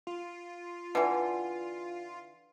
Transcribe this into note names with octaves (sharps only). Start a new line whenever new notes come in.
F4
D3 E3 B4 D5 F#5